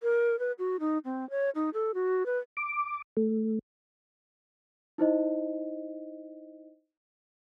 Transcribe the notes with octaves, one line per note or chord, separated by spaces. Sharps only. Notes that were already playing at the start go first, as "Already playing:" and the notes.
A#4
B4
F#4
D#4
C4
C#5
D#4
A4
F#4
B4
D6
A3
D#4 E4 C5 D#5